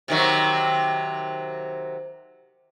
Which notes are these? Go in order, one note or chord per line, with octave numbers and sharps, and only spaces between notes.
C3 D#3 F#3